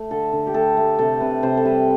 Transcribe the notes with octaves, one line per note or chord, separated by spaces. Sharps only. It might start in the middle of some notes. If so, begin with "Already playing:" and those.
Already playing: A3
D3 A4
D3
G4
A3 A4
A3
C3 A4
C3 B4
C3 C5
A4
G3 B4